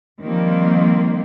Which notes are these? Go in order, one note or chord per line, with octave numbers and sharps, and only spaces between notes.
D#3 F3 G3 A#3 C4